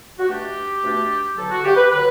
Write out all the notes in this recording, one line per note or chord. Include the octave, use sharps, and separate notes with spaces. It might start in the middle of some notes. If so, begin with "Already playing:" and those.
F#4
B2 A3 D4 G4
B2 A3 D4
E2 D3 F#3 A4
F#4
G4
B4
D3 F#3 B4